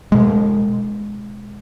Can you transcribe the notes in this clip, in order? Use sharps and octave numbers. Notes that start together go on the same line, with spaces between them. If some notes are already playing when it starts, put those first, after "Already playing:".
B2 G#3